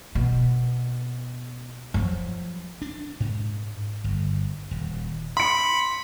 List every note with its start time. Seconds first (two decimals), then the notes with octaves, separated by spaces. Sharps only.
0.15 B2
1.94 F3 F#3
2.82 D4
3.20 G#2
4.04 G1
4.71 D#1
5.37 B5 C6 C#7